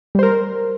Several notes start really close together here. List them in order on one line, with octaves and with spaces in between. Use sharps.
G3 C5 A#4